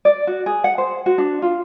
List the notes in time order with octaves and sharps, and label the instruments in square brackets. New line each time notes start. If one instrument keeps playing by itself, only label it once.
[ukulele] D5
F#4
G#4
F#5
C5
F#4
D4
F4